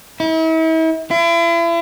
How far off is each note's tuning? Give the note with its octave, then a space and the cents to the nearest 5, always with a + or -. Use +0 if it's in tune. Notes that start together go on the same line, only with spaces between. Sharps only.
E4 -40
E4 +40